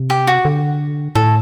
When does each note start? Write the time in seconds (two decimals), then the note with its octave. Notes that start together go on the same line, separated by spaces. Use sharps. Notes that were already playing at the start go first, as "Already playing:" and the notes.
Already playing: C3
0.10 G4
0.27 F#4
0.45 D3
1.15 A2 A4